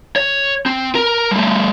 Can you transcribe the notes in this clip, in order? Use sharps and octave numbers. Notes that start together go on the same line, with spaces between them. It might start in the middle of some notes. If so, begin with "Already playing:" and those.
C#5
C4
A#4
G3 A3